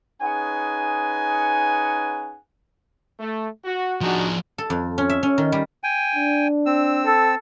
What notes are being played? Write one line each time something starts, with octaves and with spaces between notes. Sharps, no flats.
C#4 D#4 G#4 B4 F#5 G#5
A3
F#4
F3 D4 D#4 F#4 G#4
A4
F2
C#4
E5
C#4
D#3
G3
G5 G#5
D4
C4 E6
A4